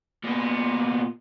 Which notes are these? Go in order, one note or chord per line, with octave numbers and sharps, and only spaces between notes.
A#2 B3